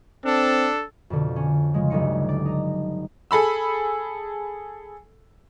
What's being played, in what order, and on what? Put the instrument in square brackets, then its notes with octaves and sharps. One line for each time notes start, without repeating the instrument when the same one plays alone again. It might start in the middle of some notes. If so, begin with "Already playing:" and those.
[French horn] C4 [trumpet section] D4 A4
[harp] F2 B2 D3
C#4
C#3 F3 G#3
G1 D2 F#3 D#4 C#7
D5
D#4 A#5
[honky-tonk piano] G#4 A4 B5 E6